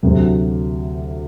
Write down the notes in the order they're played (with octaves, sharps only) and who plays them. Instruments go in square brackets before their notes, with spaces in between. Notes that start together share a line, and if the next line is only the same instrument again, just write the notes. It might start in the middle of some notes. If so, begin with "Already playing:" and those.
[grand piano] D2 C3 F#3